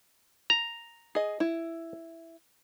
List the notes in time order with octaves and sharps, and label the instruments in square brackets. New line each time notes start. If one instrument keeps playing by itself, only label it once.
[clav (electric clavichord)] A#5
[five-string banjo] G#4 D#5
E4